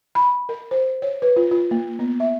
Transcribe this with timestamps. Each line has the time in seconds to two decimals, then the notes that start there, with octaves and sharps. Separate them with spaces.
0.15 B5
0.49 A#4
0.71 C5
1.02 C#5
1.22 B4
1.36 F4
1.51 F4
1.71 A#3
1.99 B3
2.20 E5